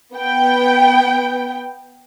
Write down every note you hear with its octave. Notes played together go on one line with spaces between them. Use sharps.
B3 G5